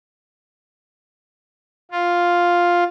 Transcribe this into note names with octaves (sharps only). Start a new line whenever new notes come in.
F4